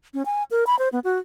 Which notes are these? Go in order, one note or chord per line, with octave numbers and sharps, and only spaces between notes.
C#4
G#5
A#4
B5
C5
B3
F#4